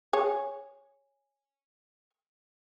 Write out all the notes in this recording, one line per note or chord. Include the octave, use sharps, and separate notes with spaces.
G#4 C#5